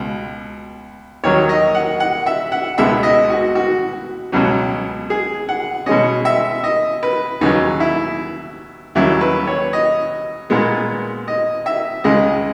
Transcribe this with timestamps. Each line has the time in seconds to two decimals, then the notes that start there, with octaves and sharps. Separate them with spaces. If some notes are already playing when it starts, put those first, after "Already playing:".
Already playing: C#2 B2
1.24 D#2 D#3 F#3 C#5
1.49 D#5
1.75 F#5
2.00 F#5
2.26 E5
2.52 F#5
2.78 C#2 B2 G#3 B3 E5
3.03 D#5
3.30 F#4
3.55 F#4
4.32 C#2 B2 F#3 C#4
5.10 G#4
5.49 F#5
5.86 B2 G#3 C#4 D#5
6.25 E5
6.64 D#5
7.03 B4
7.41 D#2 C#3 F#3 D#4
7.80 E4
8.95 D#2 C#3 F#3 E4
9.21 B4
9.47 C#5
9.73 D#5
10.50 A#2 G#3 B3
11.28 D#5
11.66 E5
12.04 C#2 C#3 G#3 D#5